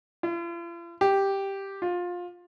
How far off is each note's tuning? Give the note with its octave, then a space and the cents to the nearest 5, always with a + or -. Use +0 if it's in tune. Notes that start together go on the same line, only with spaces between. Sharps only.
F4 -45
G4 +0
F4 +20